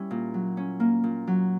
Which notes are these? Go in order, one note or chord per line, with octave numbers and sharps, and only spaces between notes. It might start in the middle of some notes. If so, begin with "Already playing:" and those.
Already playing: G3 C#4 E4
A#2
F#3
C#4
A#3
A#2
F#3